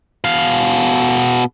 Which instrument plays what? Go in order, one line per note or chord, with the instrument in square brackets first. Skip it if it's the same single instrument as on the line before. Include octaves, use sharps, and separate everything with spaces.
[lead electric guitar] B2 F5